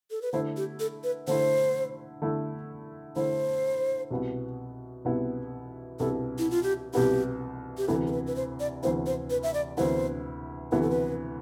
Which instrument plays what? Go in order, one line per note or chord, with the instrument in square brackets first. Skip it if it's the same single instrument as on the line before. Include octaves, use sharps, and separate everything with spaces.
[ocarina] A4
B4
[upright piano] D3 A3 E4 [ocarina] C5
[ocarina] G4
A4
B4
[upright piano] D3 A3 E4 [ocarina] C5
[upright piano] D3 A3 E4
[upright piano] D3 A3 E4 [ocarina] C5
[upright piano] C2 B2 B3 E4
C2 B2 B3 E4
[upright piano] C2 B2 B3 E4 [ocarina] A4
[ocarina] E4
F4
G4
[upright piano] C2 B2 B3 E4 [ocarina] G4
[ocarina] G4
[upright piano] D2 C3 E3 B3 E4 [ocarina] A4
[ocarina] A4
B4
B4
C5
D5
[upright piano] D2 C3 E3 B3 E4 [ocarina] C5
[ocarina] C5
B4
E5
D5
[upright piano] D2 C3 E3 B3 E4 [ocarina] C5
[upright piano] D2 C3 E3 B3 E4 [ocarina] B4
[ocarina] A4
B4